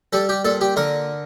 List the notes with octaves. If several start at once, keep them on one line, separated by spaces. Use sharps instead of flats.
G3 A4
G4
A#2 A4
G4
D3 A#4